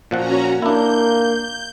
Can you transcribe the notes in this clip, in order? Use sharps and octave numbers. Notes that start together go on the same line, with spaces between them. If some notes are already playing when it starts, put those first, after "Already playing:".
A#2 F3 C#4 F#4 F#5 A#5
A#3 D4 E4 G6